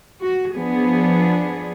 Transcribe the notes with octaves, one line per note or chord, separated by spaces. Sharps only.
F#4
F3 B3 D4 G#4